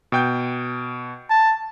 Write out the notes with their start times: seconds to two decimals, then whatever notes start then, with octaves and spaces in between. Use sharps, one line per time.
0.12 B2 G5 G6
1.30 A5